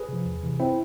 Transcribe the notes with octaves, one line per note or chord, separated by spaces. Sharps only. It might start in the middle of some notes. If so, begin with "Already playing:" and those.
Already playing: G#4 B4
C3 F3
E2
C3 E3
C4 E4